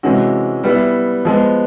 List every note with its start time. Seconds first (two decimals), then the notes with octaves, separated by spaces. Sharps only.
0.03 C3 E3 G#3 C#4 F#4
0.64 G3 B3 E4
1.25 F3 G#3 B3